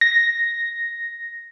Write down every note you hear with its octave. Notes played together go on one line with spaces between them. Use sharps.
A#6